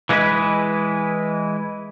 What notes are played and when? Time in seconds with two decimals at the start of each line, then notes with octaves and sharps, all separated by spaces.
0.09 E3 G#3 A3 D#4 E4 B4